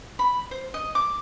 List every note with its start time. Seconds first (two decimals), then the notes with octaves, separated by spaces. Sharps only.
0.19 B5
0.51 C5
0.74 D#5
0.95 D6